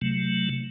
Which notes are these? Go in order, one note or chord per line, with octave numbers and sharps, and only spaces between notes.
C3 F#3 A3